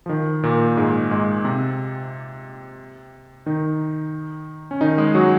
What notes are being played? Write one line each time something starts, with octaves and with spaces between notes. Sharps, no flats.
F3
D#3
A#2 A#3
G#2 G#3
G#2 G#3
C3 C4
D#3 D#4
C#4
D#3 D#4
G#3 G#4
F#3 F#4